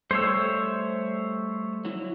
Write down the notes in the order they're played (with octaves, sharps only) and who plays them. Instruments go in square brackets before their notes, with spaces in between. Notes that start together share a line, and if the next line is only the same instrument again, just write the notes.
[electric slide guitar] G3 A3 A4 [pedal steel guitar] C5 C#5 E6
[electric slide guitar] F#3 E4